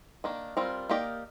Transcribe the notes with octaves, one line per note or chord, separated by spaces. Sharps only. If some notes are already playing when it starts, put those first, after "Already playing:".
D#3 A#3 D4
G3 C4 F4 A#4
A#3 D#4 G4 A#4 D5